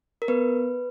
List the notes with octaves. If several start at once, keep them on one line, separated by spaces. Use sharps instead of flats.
A#4
B3 B4